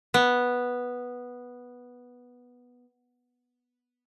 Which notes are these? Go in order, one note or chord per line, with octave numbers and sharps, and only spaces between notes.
B3